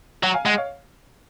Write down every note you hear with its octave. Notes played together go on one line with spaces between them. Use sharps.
F#3 F#5 A#5
F5 G#5
G#3 D#5 F#5
C#5 F5